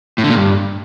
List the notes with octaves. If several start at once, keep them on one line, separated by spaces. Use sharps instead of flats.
A2
D3
A#2
G2